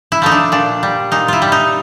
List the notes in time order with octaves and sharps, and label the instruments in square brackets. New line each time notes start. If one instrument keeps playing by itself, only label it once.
[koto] E4
F3 A3 D#4
D4
A#2 D4
G3
A#2 D#4
E4 F4
G3
D#4